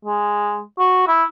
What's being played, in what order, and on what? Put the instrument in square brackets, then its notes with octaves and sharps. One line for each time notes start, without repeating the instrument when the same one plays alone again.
[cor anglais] G#3
F#4
E4